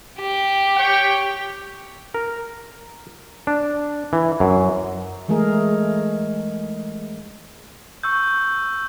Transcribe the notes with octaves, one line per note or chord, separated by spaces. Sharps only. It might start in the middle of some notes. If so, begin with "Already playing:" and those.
G4
C#5 G5
A#4
D4
E3
F#2
E3 G#3 A3 G#4 A#4
C#6 E6 G6